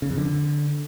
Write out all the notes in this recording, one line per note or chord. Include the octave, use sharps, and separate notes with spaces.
C#3
F2
D3